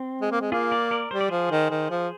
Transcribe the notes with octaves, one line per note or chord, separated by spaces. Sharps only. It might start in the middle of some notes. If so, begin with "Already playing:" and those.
Already playing: C4
G#3
A#3
G#3
A#3 F4 G#4
A#4 D5
A#4 D5
G3 C5
D5
F3 G#4 C5
D#3
D#3
F3